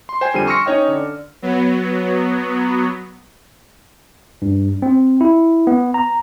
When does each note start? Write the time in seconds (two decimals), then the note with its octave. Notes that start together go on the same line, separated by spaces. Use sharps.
0.09 C6
0.21 C5 G5 G#5
0.34 F2 D3 G3 C5 G#5 D#7
0.47 C6 C#6 E6 F6 A#6 C#7
0.66 C#4 D#4 C#5 D#5 G5
0.88 D3 D5
1.42 F#3 B3
4.42 G2
4.82 C4
5.21 E4
5.67 B3
5.94 A#5